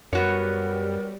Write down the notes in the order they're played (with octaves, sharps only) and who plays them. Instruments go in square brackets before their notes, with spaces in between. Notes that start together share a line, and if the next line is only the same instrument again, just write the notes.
[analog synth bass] F#2 [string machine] G3 [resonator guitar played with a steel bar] B3 F#4 C#5 [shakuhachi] A#4